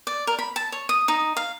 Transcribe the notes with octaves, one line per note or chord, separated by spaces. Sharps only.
D5
A#4
B5
A5
C#5
D#6
D#4
F5